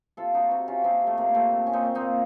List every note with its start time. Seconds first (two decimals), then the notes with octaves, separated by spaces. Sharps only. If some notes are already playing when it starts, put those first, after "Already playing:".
0.17 C3 F4 A4
0.34 C3 D#4 F#4
0.50 C3 D#4 F#4
0.67 C3 C#4 F4
0.84 C3 C4 D#4
1.01 C3
1.07 A3
1.18 C3 A#3
1.34 C3 A3 C4
1.51 A#2
1.67 A#2 C#4
1.73 C4 D#4
1.84 A#2
1.95 C4 D#4
2.01 A#2